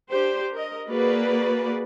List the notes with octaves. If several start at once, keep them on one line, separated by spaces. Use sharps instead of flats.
D4 G4 C5
A#4 D#5
A#3 F#4 G#4 B4 D5